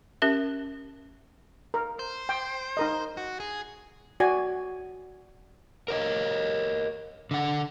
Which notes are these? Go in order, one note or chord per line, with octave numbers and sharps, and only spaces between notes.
C#4 G4 A#4 E5
A#4
C5
G5
D#4 A#4 D#5
F#4
G#4
F#4 D5 G#5
A#4 C#5 D#5
D3 F#5